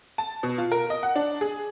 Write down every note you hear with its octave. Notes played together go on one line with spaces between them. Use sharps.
A5
B2
F4
A#4
D#5
F#5
D4
G#4